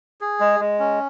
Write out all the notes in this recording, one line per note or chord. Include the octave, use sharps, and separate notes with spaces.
G#4
G#3
G#3
C#4